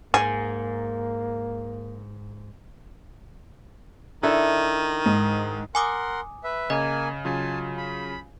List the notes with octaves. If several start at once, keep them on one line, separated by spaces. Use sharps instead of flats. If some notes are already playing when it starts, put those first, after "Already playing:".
G#2 A#3 G#4
D#3 D4 E4 A4
G#2
A#4 F#5 G#5 C6 D6 D#6
B4 E5
C#3 A#3 D#5 G#5
C#3 F#3 F4 G#5 A5
B5